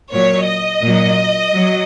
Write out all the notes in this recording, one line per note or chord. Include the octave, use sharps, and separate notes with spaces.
A#2 F#3 C#5
D#5
A#2 F#3
F#3